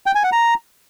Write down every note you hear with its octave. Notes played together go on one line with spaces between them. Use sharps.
G5
G#5
F#5
A#5